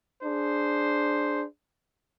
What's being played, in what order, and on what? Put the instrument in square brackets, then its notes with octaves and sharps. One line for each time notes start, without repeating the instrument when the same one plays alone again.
[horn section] D4 G#4 C5